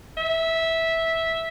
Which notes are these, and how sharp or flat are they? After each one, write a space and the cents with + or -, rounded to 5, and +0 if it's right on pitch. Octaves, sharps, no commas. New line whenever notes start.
E5 -10